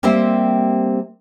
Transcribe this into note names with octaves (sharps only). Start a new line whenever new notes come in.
G3 A#3 C4 G4 C5 E5